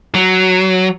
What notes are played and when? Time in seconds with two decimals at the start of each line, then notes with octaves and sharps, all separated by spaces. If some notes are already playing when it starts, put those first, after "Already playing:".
0.14 F#3